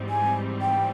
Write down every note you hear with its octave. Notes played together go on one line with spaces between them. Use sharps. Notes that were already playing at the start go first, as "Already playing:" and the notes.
Already playing: G#2 E3 G3 C4
G#5
G5